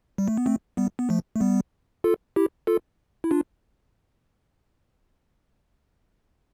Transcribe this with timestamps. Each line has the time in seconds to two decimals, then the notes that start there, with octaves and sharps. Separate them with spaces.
0.18 G3
0.28 A3
0.37 B3
0.46 A3 C4
0.77 G3 B3
0.99 B3
1.09 F3 A3
1.36 A3
1.40 G3 B3
2.04 F4 A4
2.36 E4 G4
2.67 F4 A4
3.24 E4
3.31 D4 F4